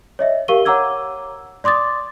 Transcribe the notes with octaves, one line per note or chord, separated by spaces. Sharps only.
C#5 D#5 E5
G4 A#4 F5 C#6 D#7 G7
C#5 F#5 A#5 D6 E6 G#6
D5 C6 D6 D#6 A6